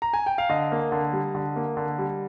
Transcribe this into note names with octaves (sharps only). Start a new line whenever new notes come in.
A#5
G#5
G5
F5
D3 D#5
A#3
D3
G3
D3
A#3
D3
G3